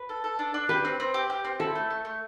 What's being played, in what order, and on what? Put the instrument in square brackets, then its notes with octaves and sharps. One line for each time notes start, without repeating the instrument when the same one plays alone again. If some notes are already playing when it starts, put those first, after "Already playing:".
Already playing: [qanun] B4
[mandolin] A4
A4
D4
D4
[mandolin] G4 [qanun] B4
[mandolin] C4
C4
G4
G4
C4
[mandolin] E4 [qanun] A4
[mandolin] A3
A3
A3